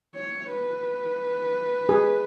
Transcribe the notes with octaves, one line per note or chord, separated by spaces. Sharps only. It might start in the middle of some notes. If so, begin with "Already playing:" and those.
C#5
B4
G#4